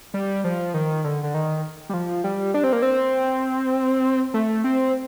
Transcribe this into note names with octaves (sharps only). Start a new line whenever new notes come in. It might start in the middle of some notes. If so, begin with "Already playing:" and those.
G3
F3
D#3
D3
D3
D#3
G3
F3
G3
D4
C4
A#3
C4
A3
C4